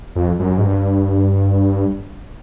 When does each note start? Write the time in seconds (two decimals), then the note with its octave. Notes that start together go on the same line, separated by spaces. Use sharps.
0.15 F2
0.39 F#2
0.58 G#2
0.65 G2